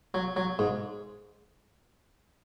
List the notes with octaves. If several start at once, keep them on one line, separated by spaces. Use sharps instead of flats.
F#3
F#3
G#2